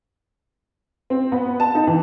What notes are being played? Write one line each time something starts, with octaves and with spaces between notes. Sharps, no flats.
C4
B3
A5
D#4
E3